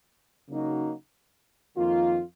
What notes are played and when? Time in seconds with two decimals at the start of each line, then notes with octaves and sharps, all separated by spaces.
0.49 C#3 F#3 A#3 D#4 F#4
1.77 F2 D#3 A#3 F4